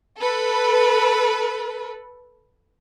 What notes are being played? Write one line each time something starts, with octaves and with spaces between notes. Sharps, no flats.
A4 B4